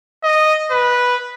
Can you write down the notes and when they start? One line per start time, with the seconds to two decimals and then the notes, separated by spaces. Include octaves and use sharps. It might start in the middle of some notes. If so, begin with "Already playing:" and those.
0.24 D#5
0.71 B4